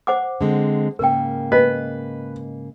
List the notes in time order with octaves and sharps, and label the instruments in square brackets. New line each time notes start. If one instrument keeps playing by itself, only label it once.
[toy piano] C5 F#5 D6
[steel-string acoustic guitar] D3 G#3 C4
[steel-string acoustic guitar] G#2 C#3 A#3 [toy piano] A#4 G5
[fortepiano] B4 [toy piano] D#5